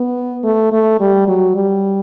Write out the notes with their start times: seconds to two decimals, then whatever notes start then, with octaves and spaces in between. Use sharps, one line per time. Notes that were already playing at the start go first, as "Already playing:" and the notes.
Already playing: B3
0.43 A3
0.72 A3
1.00 G3
1.28 F#3
1.56 G3